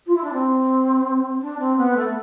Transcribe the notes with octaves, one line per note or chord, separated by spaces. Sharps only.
F4
E4
D4
C4
D4
C4
B3
A3